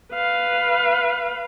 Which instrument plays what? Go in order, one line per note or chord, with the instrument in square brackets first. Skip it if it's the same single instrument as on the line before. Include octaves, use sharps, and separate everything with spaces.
[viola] B4 F5